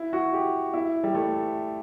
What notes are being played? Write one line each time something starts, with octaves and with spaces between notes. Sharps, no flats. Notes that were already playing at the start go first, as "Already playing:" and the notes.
Already playing: E4
F#4
G4
E4
G3
A3